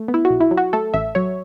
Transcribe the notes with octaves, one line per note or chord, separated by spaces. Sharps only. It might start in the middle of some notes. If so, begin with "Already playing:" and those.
Already playing: A3
B3
E4
F#4
B1
E4
F#3
F#4
A3 A4
A1 E5
F#3 C#5